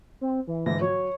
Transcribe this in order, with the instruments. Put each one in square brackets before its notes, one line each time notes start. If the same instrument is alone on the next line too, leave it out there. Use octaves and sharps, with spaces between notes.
[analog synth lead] C4
E3
[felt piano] G#2 D3 E3 [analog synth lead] A#6
[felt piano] F#3 [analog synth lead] C#5